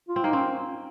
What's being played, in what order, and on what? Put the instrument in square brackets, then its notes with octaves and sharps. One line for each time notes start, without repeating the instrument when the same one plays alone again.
[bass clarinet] F4
[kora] C4
[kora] A#3 [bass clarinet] D#4
[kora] C4 [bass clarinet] C#4